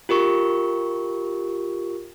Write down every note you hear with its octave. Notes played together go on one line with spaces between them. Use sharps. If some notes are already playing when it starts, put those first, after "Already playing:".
F4 G4 A#4 C#6